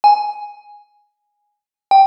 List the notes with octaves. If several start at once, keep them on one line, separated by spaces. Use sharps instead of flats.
G#5
G5